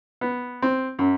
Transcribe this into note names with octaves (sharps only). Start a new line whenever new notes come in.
B3
C4
F#2